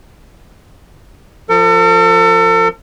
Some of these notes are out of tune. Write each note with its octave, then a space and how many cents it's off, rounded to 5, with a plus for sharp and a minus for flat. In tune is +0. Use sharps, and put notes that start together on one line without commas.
F3 +0 A4 +40